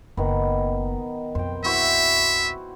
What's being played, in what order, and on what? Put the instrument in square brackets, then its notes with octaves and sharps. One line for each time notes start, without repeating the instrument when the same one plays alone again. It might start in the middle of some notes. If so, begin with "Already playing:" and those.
[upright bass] F#1 [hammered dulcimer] D#3 B3
[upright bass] B1 F2 [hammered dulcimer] C5 G5
[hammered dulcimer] E4 F#4 C5 [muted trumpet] E5